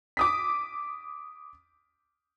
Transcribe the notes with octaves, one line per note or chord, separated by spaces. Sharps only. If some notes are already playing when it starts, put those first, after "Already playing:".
D6 D#6 B6